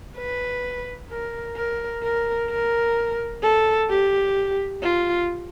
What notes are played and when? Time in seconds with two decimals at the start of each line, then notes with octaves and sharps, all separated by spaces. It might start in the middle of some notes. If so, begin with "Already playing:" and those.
0.17 B4
1.10 A#4
1.56 A#4
2.03 A#4
2.50 A#4
3.43 A4
3.90 G4
4.83 F4